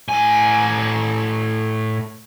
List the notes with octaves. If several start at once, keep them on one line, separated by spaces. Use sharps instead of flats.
A2 G#5